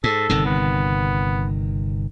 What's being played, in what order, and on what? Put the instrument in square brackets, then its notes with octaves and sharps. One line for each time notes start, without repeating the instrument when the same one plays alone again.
[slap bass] G#2 [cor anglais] A4
[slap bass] G1 C3 D#3
[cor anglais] B3